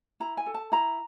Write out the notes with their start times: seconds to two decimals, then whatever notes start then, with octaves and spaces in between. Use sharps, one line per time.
0.20 E4 A#5
0.37 G#5
0.46 A4
0.54 A5
0.72 E4 A#5